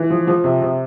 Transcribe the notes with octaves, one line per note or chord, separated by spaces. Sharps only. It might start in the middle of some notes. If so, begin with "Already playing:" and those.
Already playing: E3
F3
F3
C3
C3